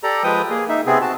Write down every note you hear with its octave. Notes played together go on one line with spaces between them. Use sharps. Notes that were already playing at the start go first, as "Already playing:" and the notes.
G4 A4 D5 A#5
F3 G#3 B4 G5 D#6
A#3 G#4
D#4 E5
C3 B3 C4 G#4
C4 F#4 A5